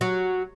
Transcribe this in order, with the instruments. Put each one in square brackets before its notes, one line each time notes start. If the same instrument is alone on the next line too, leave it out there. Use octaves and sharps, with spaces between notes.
[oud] F#3